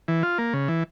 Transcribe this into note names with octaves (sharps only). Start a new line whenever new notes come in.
E3
F4
A#3
C#3
E3